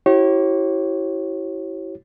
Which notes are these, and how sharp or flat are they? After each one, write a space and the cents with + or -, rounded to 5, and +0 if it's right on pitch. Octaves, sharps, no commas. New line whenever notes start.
E4 +0 G4 -45 C#5 -30